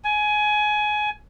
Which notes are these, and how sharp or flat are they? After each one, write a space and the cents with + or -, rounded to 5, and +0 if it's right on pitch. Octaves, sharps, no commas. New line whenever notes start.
G#5 +20